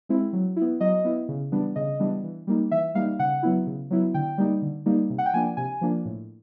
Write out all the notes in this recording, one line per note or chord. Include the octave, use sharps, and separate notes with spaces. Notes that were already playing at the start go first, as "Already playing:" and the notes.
G#3 C4 E4
F#3
B3 E4
F#3 D#5
B3 E4
C#3
E3 G3 B3 D4
C#3 D#5
E3 G3 B3 D4
E3
G3 A#3 D#4
E3 E5
G3 A#3 D#4 F5
C#3 F#5
F#3 B3 E4
C#3
F#3 B3 E4
D3 G5
G3 A#3 D#4
D3
G3 A#3 D#4
C3
F#5
G5
F3 A#3 D4 G#5
C3 G#5
F3 A#3 D4
A2